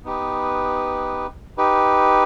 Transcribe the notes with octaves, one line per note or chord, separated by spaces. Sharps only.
B3 D#4 G4 B4
D#4 G4 B4